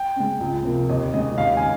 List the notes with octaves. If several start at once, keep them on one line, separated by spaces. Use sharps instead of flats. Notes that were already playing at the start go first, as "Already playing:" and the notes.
Already playing: G5
C#3 G#3
C#2
C3 F3 A#3
D#2 D#5
C#3 G#3 D#5
D#2 F5
G#5